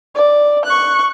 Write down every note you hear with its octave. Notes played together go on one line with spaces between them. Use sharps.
D5
C#6 F#6